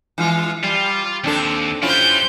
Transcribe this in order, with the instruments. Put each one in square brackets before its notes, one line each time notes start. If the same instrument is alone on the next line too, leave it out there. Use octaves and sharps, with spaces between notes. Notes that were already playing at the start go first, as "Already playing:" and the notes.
[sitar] E3 G#3 F4
[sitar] G3 [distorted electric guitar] F4
[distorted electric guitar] D#2 [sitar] C4 D4 A4
[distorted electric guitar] G3 B4 [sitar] C#4 E4 F4 [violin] C5 G6